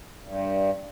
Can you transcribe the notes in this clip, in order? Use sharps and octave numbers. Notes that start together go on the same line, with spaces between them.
G2